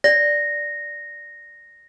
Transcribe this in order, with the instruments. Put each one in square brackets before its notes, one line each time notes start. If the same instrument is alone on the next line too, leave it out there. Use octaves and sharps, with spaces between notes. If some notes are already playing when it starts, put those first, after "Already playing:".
[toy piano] D5 [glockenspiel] A#6